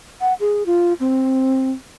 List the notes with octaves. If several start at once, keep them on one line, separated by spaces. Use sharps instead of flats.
F#5
G#4
F4
C4